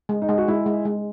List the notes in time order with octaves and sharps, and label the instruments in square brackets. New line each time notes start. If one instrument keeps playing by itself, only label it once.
[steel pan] G#3
[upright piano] D#4
[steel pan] G#3
[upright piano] F#4
[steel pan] G#3 [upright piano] E4
[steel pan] G#3
G#3